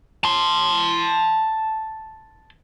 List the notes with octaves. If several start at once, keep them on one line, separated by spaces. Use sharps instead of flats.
A5 C6